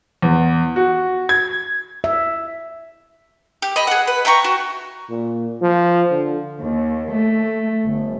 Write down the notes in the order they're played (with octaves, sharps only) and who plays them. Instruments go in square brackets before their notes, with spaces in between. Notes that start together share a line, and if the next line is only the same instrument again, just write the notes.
[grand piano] E2
F#4
G#6
[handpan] E5
[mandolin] G4
D#5 B5
G#4 F#5
B4
E5 G5 A#5 C#6
F#4
[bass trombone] A#2
F3
D3
[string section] D#2
A3
G1